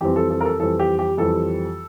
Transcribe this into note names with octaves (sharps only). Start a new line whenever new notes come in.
F2 E3 G3 C4 G4
A4
A4
A#4
A4
F2 E3 G3 C4 A4
G4
G4
F2 E3 G3 C4 A4